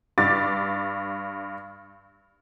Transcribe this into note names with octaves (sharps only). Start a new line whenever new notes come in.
G2 D6 A6